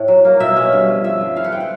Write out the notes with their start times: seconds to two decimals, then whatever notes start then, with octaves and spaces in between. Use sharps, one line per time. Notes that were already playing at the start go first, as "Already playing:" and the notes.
Already playing: A2 C5
0.08 F#3
0.25 A#3
0.40 B2 E5
0.56 C#4
0.72 G2
0.89 F3
1.04 F3 E5
1.21 D3
1.36 E3 F5
1.44 F#5
1.52 C4 G5
1.60 F#5